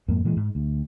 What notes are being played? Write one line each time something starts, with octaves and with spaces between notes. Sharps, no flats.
F2 G#2 A#3
A#2 E3 G#3
G#2
D2